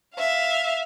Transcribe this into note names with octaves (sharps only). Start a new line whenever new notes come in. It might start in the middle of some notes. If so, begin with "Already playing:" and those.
E5 F5